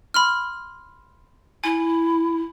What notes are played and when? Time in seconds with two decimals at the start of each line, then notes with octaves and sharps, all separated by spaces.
0.14 B5 C6 F6
1.64 E4 G#5